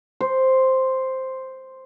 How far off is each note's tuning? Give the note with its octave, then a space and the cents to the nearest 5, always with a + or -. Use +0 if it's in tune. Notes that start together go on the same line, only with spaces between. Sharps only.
C5 +0